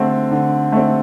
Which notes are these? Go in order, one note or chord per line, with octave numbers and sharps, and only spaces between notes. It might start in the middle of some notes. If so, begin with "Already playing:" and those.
Already playing: D3 A3 C4
D3
A3 C4